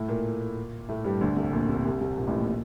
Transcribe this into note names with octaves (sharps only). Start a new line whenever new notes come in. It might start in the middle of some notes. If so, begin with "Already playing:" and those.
Already playing: A2 A3
A#2 A#3
A2 A3
G2 G3
D2 D3
C2 C3
A#1 A#2
C2 C3
C2 C3
C2 C3
A#1 A#2
A1 A2
A#1 A#2